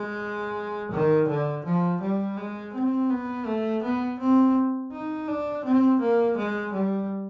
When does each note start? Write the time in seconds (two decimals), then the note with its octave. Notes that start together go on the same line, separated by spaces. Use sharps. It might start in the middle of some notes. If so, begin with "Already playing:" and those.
Already playing: G#3
0.92 D#3
1.28 D3
1.65 F3
2.01 G3
2.37 G#3
2.74 C4
3.10 B3
3.46 A3
3.83 B3
4.20 C4
4.92 D#4
5.28 D4
5.65 C4
6.00 A#3
6.37 G#3
6.73 G3